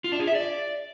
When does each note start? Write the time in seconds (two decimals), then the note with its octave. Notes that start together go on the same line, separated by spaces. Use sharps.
0.04 F4
0.12 D4
0.20 G#4
0.27 E5
0.35 D5